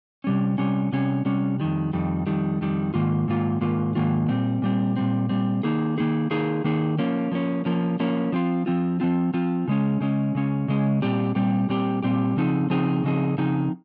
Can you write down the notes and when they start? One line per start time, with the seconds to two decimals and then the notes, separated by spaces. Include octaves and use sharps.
0.24 C3 G3 C#4
0.58 C3 G3 C#4
0.92 C3 G3 C#4
1.25 C3 G3 C#4
1.60 F2 D#3 G3
1.93 F2 D#3 G3
2.27 F2 D#3 G3
2.61 F2 D#3 G3
2.94 G#2 D#3 A#3 F4
3.28 G#2 D#3 A#3 F4
3.61 G#2 D#3 A#3 F4
3.95 G#2 D#3 A#3 F4
4.28 A#2 G3 C4
4.62 A#2 G3 C4
4.96 A#2 G3 C4
5.29 A#2 G3 C4
5.63 D#3 A#3 D#4 G#4
5.98 D#3 A#3 D#4 G#4
6.30 D#3 A#3 D#4 G#4
6.64 D#3 A#3 D#4 G#4
6.99 F3 A#3 C#4
7.32 F3 A#3 C#4
7.65 F3 A#3 C#4
8.00 F3 A#3 C#4
8.32 F3 C4 F4
8.66 F3 C4 F4
9.00 F3 C4 F4
9.34 F3 C4 F4
9.68 C#3 G#3 C#4
10.00 C#3 G#3 C#4
10.35 C#3 G#3 C#4
10.68 C#3 G#3 C#4
11.02 A#2 G3 C4 G4
11.35 A#2 G3 C4 G4
11.69 A#2 G3 C4 G4
12.03 A#2 G3 C4 G4
12.37 C#3 F3 C4 D#4 G#4
12.70 C#3 F3 C4 D#4 G#4
13.04 C#3 F3 C4 D#4 G#4
13.38 C#3 F3 C4 D#4 G#4